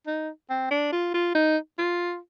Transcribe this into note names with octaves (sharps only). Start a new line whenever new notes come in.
D#4
C4
D4
F4
F4
D#4
F4